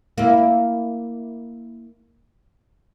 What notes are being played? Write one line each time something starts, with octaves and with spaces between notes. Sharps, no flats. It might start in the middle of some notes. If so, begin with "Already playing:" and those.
A#3 E4